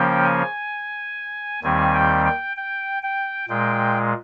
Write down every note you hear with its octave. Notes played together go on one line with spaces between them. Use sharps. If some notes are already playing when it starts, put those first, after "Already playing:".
Already playing: C#3 F3 A#3 C#4 G5
G#5
D#2 D#3 G3 C4 G#5
G5
G5
G5
G5
A#2 G#3 G5